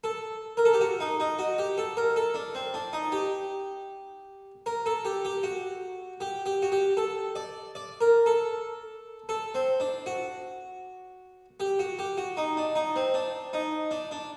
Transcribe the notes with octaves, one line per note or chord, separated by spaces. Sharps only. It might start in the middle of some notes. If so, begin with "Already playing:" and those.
A4
A#4
A4
G4
F#4
D#4
D#4
F#4
G4
A4
A#4
A4
D4
C4
D4
D#4
G4
A#4
A4
G4
G4
F#4
G4
G4
F#4
G4
A4
D5
D5
A#4
A4
A4
C4
D4
F#4
G4
F#4
G4
F#4
D#4
D4
D#4
C4
D4
D#4
D4
D4